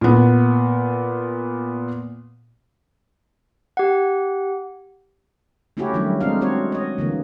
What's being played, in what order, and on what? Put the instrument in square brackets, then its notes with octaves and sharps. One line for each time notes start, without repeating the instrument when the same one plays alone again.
[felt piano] A#2 B3
[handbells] G4 F#5
[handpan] A3 C#4 E4 F#4 G4 C#5
D#3 F#3 G3 A3 D4 E4
G#3 A3 C4 D4 D#4 F5
C4 F#4 C#5
C#5 D#5
D3 E3 A#3